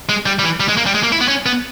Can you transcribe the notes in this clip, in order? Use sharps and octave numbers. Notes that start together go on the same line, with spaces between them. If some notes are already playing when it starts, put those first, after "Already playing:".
G#3
G3
G3
E3
G3
G#3
A#3
G3
G#3
A#3
E4
B3
C#4
B3